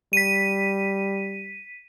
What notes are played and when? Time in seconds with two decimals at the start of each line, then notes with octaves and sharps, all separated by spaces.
0.13 G3 B6 D#7